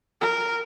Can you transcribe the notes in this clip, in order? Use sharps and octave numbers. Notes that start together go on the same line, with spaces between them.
A#4